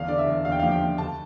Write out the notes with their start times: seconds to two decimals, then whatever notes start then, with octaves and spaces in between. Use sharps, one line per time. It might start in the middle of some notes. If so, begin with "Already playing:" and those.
Already playing: G1 E2 F5
0.08 D3 D5
0.18 E5
0.26 E2
0.45 E2 F5
0.52 G5
0.60 F3 F5
0.71 G5
0.81 F3
0.98 D2 A5